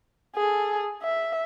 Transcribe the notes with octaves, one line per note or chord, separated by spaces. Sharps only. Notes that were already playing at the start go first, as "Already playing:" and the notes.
G#4 A4
E5